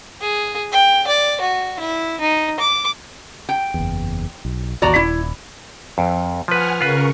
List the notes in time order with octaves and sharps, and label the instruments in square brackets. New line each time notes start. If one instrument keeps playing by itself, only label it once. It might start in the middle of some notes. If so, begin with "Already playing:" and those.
[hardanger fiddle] G#4
G5
D5
F#4
E4
D#4
D6
[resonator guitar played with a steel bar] G5
[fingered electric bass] F#1 E2
B1
[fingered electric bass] A1 D#2 [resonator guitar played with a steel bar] F#4 D5 A#5
[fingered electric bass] D#1 [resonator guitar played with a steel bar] E4
[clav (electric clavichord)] F2
[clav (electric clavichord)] F3 B4 [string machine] F#5 G#5 F6
[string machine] C#3 A#4 C#6 [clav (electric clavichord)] F4 B4